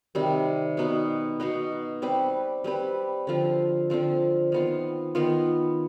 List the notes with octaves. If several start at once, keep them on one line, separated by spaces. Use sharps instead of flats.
C3 D#3 G3 C4
B2 B3 D#4 B4
B2 B3 D#4 B4
G3 C4 G4 B4
G3 C4 G4 B4
D3 F3 C4 F4
D3 F3 C4 F4
D#3 B3 F4
D#3 B3 F4